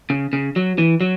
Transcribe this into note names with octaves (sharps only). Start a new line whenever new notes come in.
C#3
C#3
F#3
E3
F#3